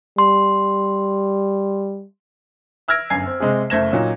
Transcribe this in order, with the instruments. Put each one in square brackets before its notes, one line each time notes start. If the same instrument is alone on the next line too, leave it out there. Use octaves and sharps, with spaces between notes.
[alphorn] G3 [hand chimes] C6
[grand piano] E5 E6 F6 G#6 A#6 D7
G1 F#2 G#5 G#6 C7
C4
C3 G#3 C4 G#4
F#1 A3 C5 G#6 A#6 E7
A#2 F#3 C#4 D#4